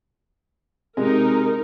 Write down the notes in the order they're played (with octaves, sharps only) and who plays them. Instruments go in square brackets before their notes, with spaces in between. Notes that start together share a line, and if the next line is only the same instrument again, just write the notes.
[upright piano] C3 [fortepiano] G#3 [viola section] D#4 A#4